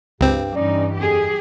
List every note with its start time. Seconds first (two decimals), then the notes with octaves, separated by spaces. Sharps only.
0.21 C#2 G2 C4 G4
0.55 G2 E3 G3 C#4 D#4 D5
0.96 F2 G4 G#4